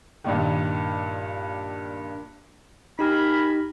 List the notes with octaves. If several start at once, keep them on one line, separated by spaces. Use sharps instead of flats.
G2 A#2 D#3
D#4 G4 A#4 G#5 B5